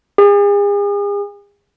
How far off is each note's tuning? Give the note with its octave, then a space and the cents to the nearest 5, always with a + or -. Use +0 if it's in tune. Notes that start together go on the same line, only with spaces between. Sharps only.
G#4 -40